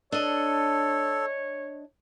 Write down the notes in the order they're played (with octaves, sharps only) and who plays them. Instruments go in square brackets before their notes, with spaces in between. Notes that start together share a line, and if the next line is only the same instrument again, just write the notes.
[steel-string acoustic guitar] D4 D#5 [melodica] A4 [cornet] C#5